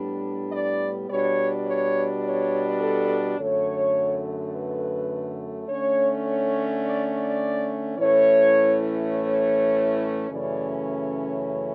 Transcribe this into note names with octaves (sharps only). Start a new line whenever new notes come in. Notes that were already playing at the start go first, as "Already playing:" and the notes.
Already playing: A2 G3 B3 D4
D5
B2 G3 D4 C#5
C#5
C#5
A4
F#2 D3 A3 C#5
B4
D3 A3 C#4 C#5
C#5
D5
D5
A2 E3 A3 C#4 C#5
C#5
F#2 C#3 E3 A3 C#4 D5
C#5